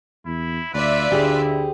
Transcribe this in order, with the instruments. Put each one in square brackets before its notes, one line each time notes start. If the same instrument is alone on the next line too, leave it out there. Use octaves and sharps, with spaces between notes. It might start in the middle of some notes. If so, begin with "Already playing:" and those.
[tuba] E2 [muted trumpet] E4
[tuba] D2 [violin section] F4 D5 E5 [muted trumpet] B4
[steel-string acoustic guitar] D2 G4 G#4 [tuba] D3
[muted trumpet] E4